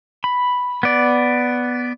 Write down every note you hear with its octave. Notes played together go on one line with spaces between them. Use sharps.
B5
B3 D5